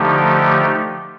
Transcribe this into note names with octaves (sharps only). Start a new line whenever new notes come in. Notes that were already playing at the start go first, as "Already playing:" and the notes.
Already playing: D3 F3 A3 D#4 G4